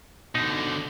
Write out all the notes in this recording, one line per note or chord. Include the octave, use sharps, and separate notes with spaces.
B2 D3 D#4